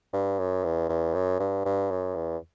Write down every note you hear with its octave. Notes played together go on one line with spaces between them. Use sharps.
G2
F#2
E2
E2
F#2
G2
G2
F#2
E2